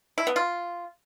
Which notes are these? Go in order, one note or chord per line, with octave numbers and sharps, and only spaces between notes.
E4
B3
F4